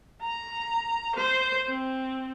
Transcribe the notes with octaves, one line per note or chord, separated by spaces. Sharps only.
A#5
C5
C4